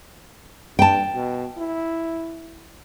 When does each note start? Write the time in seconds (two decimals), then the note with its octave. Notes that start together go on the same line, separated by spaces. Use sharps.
0.79 G2 G5 A5
1.14 B2
1.57 E4